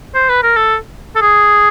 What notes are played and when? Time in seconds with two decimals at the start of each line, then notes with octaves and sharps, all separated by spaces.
0.15 C5
0.29 B4
0.43 A#4
0.56 A4
1.16 A4
1.21 G#4